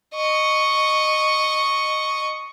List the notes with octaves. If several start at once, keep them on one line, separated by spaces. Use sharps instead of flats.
D#5 C#6